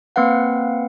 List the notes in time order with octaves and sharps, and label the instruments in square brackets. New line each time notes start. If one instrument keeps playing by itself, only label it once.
[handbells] A#3 C4 B4 F5 F#5